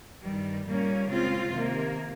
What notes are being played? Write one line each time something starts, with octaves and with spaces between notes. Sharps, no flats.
G2 D#3 G3
A#2 G3 A#3 C#4
C#3 G#3 C4 F4
C3 D#3 A#3